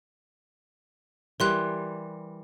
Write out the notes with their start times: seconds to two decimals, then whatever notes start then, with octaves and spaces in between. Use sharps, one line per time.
1.40 E3 G3 A#4 C6 F#6